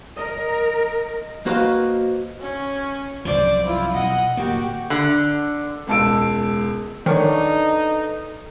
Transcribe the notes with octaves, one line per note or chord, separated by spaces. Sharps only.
A#4 D#5
A#3 F#4 B4 C5 D#5 F5
C#4
C2 F#2 F3 C5 D5
E4 F4
B1 D#5 F#5
D1 A#3 F#4 G4
D3
E1 C#2 A5 E6 D7
D3 D#3 D#4 A4 B4 C#5 D5